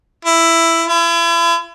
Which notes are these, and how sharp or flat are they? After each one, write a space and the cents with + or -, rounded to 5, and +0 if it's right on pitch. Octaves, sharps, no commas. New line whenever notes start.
E4 +10
E4 +40